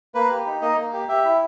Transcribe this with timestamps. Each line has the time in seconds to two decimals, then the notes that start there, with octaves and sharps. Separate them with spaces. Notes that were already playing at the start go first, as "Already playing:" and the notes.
0.15 A#3 B4
0.31 G4
0.46 D#4
0.61 A#3 D#5
0.77 A#3
0.93 G4
1.08 G4 E5
1.25 E4